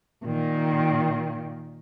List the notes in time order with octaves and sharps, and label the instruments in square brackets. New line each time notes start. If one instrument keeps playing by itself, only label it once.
[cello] A#2 D#3